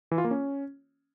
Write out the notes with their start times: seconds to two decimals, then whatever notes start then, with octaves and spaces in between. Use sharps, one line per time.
0.11 E3
0.18 F4
0.24 A#3
0.31 C#4